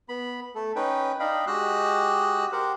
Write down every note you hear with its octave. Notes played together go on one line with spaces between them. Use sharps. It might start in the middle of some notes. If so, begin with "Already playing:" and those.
B3 B5
A3 A4
C#4 D#4 B4 G5
D4 D#4 D#5 F5 G5 B5
G#3 F#4 G4 D#5 E6 F#6
G4 A#4 C5 F#5